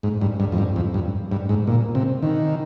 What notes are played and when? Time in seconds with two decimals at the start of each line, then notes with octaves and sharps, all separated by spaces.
0.03 G#2
0.21 G2
0.40 G2
0.52 F2
0.58 G2
0.76 F2
0.94 G2
1.32 G2
1.49 G#2
1.67 A#2
1.95 C3
2.23 D#3